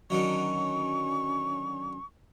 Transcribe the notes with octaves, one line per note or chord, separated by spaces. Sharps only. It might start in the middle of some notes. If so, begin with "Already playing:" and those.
D3 D#3 F#3 C#4 C#6